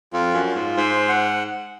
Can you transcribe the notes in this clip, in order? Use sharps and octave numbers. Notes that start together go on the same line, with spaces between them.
F2 F4
F#2
F4
G#2
G#2 C5
F#5